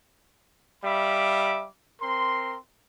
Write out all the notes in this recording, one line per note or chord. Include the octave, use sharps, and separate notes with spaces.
G3 E5 F5 B5 D6
C4 A#4 C6